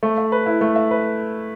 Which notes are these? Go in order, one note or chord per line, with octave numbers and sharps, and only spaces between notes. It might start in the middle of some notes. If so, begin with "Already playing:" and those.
A3
E5
B4
E4
A3
E5
B4